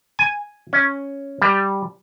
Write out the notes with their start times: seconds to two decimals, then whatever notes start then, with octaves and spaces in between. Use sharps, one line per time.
0.19 G#5
0.73 C#4
1.42 G3